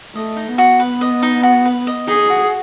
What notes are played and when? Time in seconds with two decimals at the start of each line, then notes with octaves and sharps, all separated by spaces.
0.15 A3 D#5
0.36 D#4
0.47 B3
0.58 F#4
0.80 B4
1.01 D#5
1.22 D#4
1.43 F#4
1.65 B4
1.87 D#5
2.08 D#4 G#4
2.30 F#4